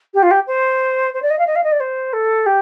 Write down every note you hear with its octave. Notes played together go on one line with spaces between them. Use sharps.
G4
F4
G4
C5
C5
D5
D#5
F5
D#5
F5
D#5
D5
C5
A4
G4